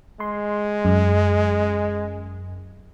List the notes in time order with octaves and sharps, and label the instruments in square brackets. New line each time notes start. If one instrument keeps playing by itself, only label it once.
[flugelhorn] G#3 [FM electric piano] C6
[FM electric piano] F#2